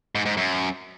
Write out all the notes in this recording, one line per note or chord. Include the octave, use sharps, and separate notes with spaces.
G#2
G#2
F#2